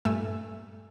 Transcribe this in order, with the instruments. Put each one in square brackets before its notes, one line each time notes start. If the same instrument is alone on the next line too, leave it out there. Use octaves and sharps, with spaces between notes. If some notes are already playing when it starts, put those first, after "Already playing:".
[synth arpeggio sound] G2 A#2 A3 E5 G#5 E6